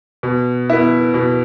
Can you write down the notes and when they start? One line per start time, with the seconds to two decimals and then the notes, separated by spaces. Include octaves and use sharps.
0.23 B2
0.70 B3 E4
1.14 B2